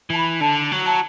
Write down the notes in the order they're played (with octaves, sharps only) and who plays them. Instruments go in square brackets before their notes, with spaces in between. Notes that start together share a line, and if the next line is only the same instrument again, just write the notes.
[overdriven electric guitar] E3 [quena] A5
[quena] B5
[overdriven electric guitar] D3 [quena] A5
[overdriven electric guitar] F#3
[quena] A5